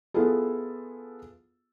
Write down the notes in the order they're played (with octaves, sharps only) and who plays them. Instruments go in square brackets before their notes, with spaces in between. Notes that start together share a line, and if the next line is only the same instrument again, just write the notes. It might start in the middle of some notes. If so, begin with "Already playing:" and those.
[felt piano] B3 E4 F4 G#4 A4